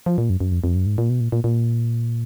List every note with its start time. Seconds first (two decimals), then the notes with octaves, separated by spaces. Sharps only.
0.06 F3
0.18 A#2
0.30 F#2
0.40 F#2
0.52 F2
0.64 F2
0.75 F#2
0.86 G#2
0.98 A#2
1.10 B2
1.20 A#2
1.32 A#2
1.44 A#2